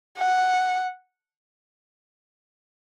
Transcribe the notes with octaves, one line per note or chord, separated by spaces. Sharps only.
F#5